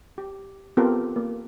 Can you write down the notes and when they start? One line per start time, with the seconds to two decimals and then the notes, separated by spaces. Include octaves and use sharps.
0.18 G4
0.77 B3 C4 F4 G4 A4 A#4
1.16 A#3